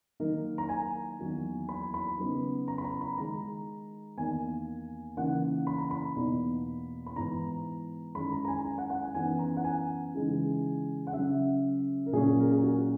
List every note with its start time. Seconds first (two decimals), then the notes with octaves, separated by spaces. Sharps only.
0.20 D#3 F#3 A#3 D#4 A#4
0.58 A#5
0.69 G#5
1.19 E2 D#3 F#3 A#3
1.69 B5
1.94 B5
2.19 C#3 F#3 B3 D#4
2.68 A#5
2.78 B5
2.84 A#5
3.01 B5
3.18 D#3 G#3 D#4 A#5
4.17 E2 D#3 A#3 D#4 G#5
5.17 C#3 E3 A#3 D#4 F#5
5.67 B5
5.78 A#5
5.91 B5
6.16 E2 B2 A#3 D#4
7.06 B5
7.16 G#2 E3 B3 A#5
8.15 F#2 D#3 G#3 B5
8.32 A#5
8.45 A#5
8.48 G#5
8.65 G#5
8.78 F#5
8.90 F#5
9.03 G#5
9.14 F#2 E3 B3 D#4 G#5
9.39 A#5
9.57 F#5
9.64 G#5
10.15 C#3 E3 G#3 D#4
11.07 F#5
11.13 C#3 F#3 C#4 E5
12.06 A#4
12.13 A#2 F#3 C#4 G#4
12.40 A#4
12.51 G#4
12.63 F#4